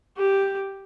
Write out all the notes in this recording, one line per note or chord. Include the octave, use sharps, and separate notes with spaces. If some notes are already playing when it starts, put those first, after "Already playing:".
G4